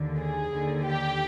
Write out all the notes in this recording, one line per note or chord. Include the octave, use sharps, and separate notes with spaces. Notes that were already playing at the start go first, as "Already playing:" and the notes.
Already playing: D#2 D3
G#4
D#2 D3
G4